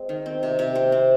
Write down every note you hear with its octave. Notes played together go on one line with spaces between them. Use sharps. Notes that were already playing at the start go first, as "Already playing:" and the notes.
Already playing: G#3 C4
D#3
C4
C3
C3
C4
C4